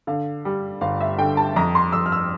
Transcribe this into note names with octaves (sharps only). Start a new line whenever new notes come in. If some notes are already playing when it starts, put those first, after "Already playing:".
D3 F5
G3
G1 F5
E5
D3 G5
A5
F2 A#5
C6
F2 E6
F6
E6